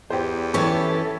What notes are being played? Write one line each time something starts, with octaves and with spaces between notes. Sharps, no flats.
E2 G4 C5
E3 C#4 E4 G4 A4 C#6 G#6